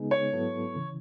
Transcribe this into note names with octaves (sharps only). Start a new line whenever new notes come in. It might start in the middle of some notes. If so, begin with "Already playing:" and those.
Already playing: C#3 G#3 B3 D#4 G#4
C#5
G#2 F#3 B3 E4 A4
C#3 E3